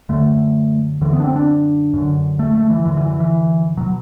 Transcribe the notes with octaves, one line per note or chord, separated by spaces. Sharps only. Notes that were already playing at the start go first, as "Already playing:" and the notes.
F#2 D3 A3
F#2 D3 E3
B3
D4
C4
D4
F#2 D3
A3
A3
E3
F#2 D3 E3
E3
E3
E3
B2 F#3